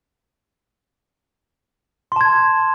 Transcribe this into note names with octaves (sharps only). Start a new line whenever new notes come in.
A5 C6 G#6